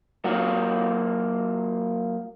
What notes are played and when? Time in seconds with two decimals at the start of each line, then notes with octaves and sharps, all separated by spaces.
0.24 F#3 A#3 F4 F#4